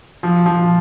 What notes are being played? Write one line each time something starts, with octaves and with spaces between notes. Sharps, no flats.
F3
F3